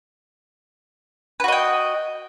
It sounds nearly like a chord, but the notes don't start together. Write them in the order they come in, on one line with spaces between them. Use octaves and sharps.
B4 F#4 D#5 G5